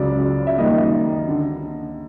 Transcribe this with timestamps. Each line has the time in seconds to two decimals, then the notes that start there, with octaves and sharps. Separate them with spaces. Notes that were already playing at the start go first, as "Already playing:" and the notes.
Already playing: C#2 C#3 F#3 D5
0.47 E5
0.58 F#2 D#3 G3 A#3 D#5
1.28 D3